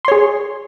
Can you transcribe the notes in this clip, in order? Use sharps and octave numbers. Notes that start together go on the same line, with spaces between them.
G#4 C#5 C6